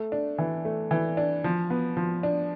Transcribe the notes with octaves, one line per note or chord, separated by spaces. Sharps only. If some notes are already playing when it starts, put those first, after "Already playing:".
Already playing: A3
D4
E3
A3
E3
D4
F3
B3
F3
D4